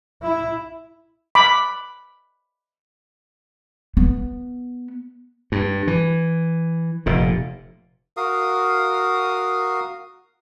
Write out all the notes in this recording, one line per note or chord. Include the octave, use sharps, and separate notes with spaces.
E4
B5 D6
B3
G2
E3
F1 A#2
F#4 A#4 F5 D#6